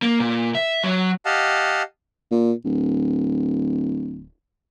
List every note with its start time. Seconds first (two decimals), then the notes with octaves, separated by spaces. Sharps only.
0.02 A#3
0.20 A#2
0.55 E5
0.84 F#3
1.25 G4 D#5 F5 F#5 A5
2.31 A#2
2.64 D1